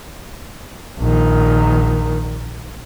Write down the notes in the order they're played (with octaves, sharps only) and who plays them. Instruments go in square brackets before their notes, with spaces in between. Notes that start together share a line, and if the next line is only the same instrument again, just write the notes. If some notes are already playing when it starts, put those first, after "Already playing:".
[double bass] A#1 D#3